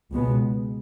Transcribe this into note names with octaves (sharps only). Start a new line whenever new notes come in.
C#2 B2 G#3 B3